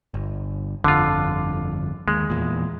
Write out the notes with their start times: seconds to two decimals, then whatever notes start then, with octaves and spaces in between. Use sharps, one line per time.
0.14 G1
0.84 G1 F2 D3 F4
2.08 D#2 G#3
2.30 E2 A#2